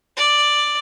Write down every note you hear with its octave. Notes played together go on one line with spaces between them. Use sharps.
D5